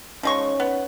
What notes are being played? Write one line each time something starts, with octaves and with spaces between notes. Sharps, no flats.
F3 G#3 C#4 D#4 C#5 C#6
B3